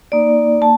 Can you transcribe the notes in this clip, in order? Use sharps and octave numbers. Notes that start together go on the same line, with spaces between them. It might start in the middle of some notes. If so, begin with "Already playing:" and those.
A#3 D#4 D5
A#3 A5